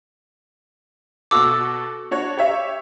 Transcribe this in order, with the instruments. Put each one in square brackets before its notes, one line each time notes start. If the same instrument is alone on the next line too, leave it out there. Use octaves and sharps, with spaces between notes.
[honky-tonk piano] B2 F#4 A4 [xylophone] D6 E6
[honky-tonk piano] D4 F#4 C#5
G4 C#5 E5